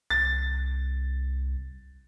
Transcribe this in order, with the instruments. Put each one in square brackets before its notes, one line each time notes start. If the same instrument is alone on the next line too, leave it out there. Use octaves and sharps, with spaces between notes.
[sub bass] C2 [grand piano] A6